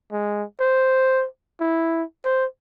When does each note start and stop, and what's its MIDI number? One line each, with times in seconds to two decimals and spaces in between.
0.12 0.44 56
0.60 1.26 72
1.61 2.03 64
2.25 2.45 72